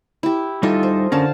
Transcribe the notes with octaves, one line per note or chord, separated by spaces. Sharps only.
E4 G4
G3 D#4 F4 A4 D#5 E5
C5
D3 C#4 A#4 F5 A5